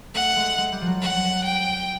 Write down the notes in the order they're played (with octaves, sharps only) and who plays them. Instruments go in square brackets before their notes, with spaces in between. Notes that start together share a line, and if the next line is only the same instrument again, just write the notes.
[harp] A3 [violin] F#5
[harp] G#3
G#3
G3
F3
F#3
[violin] F#5
G5